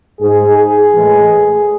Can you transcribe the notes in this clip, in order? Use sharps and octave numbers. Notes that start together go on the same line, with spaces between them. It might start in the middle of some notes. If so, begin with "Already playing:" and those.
G#2 G#3 G#4
G#4
A2 E3 G#3